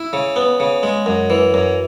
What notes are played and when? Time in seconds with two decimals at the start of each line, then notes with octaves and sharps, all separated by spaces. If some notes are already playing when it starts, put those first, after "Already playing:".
Already playing: E4
0.13 C#3
0.36 B3
0.60 C#3
0.83 G#3
1.06 F#2
1.30 E3
1.54 F#2